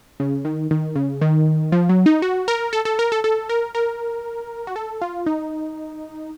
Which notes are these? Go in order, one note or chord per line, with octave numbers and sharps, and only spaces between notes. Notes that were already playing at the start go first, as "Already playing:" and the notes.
C#3
D#3
D#3
C#3
D#3
F3
F#3
D#4
F#4
A#4
A4
A4
A#4
A4
A4
A#4
A#4
F#4
A4
F4
D#4